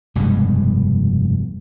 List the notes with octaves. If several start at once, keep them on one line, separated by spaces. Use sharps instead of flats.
F1 G2 B2 G#3